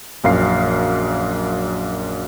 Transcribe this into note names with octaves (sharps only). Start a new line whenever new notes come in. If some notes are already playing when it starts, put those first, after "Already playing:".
A#1 F#2 F5 C7